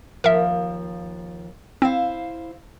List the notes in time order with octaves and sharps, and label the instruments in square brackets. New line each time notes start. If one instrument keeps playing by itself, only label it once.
[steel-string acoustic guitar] D#2 F3 [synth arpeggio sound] A#4 E5
[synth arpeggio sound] C4 [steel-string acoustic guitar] E4 C5 F5